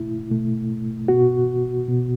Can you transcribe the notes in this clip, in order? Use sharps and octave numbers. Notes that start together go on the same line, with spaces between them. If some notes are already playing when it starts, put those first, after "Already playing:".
Already playing: B2 A3 E4
B2 A3
B2 B3 F#4
B2 B3